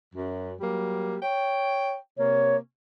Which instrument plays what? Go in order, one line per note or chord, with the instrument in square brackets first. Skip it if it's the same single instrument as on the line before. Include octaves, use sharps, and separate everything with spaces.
[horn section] F#2
F#3 G3 A#3
C#5 G5
[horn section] C3 A#3 [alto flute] C#5